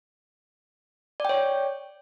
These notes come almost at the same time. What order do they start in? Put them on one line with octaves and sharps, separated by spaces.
D5 G5 C#5